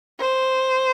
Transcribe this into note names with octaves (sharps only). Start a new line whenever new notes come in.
C5